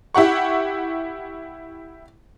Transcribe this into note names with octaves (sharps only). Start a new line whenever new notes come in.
E4 G4 F#5 C#6